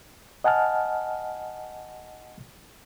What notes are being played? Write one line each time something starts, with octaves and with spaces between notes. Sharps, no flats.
D#5 F#5 G#5 A5 F6